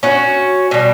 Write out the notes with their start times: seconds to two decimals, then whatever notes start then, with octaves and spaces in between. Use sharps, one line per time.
0.03 C#4 F#4
0.71 B2 G3